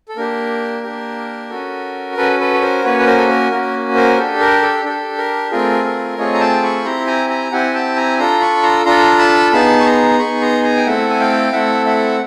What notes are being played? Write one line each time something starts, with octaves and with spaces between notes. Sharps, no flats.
A4
A#3 D4 G4 A#4
A#3 D4 G4
C#4 F#4 A4
C#4 F#4 A4 B4
A4 B4
C#5
A#4 C5
A#3 C#4 F#4 B4 C#5
B4
A#4 C5
A4
A#4
A#3 C#4 F#4 A#4
A#4 C5
D4 G4 A4
A#4
A4
D4 G4 A4
A#4
A3 C4 F4 G#4 A#4
A#4
A3 C4 F4 G#4 C#5 D#5
A#5
G5 A5
B5 C#6
C4 E4 G4 A#5 C6
G#5 A#5
G#5 A#5
C4 E4 G4 F#5 G#5
G5 A5
G#5 A#5
D4 F4 A4 A#5 C6
B5 C#6
A#5 C6
D4 F4 A4 A#5 C6
A5 B5
B3 D#4 G#4 A5 B5
C#6
A#5 C6
B3 D#4 G#4 B5 C#6
A#5 C6
G#5 A#5
G5
A3 C4 E4 A4 E5 F#5
G#5
F5 G5
A3 C4 E4 A4 E5 F#5
E5 F#5